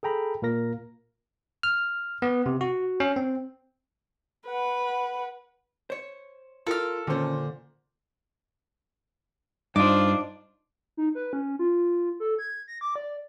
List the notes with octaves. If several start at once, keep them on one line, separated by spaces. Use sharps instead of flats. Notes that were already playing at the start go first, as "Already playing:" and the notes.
G#4 A4 G5 A#5 B5
A#2 A#3 A#4 A#6
F6
B3
C3
F#4
C#4
C4
B4 F#5
C5 C#5
F4 A4 A#4 F6
A#2 D3 D#3 C#4 C5
G2 D4 D#4 F4 C5 D#5 D6
D#4
B4
C#4
F4
A4
G#6
A#6
D6
D5